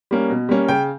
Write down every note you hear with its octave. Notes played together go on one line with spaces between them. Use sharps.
G3 A#3 C#4
B2
G3 A#3 C#4
C#3 G5